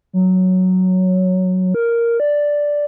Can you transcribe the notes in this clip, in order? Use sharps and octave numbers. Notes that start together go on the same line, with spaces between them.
F#3
A#4
D5